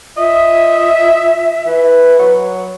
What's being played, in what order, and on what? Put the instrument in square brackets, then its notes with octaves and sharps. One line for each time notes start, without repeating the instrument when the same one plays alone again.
[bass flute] F4 [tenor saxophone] D#5 [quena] E5
[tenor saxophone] E3 [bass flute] B4
[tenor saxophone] F#3